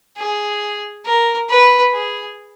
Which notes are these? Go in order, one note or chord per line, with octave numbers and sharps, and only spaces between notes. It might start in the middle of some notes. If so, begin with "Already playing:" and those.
G#4
A#4
B4
G#4